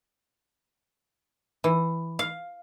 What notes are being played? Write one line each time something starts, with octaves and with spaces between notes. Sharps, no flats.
E3
F5